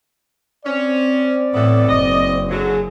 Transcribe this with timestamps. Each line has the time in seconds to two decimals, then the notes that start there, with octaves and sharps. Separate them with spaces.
0.65 C4 C#4 D5
1.53 A2 E3 B3 A4
1.89 F#1 D#5
2.49 D3 F#3 G#4